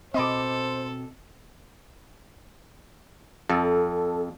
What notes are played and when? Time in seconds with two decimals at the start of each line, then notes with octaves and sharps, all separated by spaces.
0.14 B2 C4 A4 C5 D#5 B5 D6
3.49 F2 A4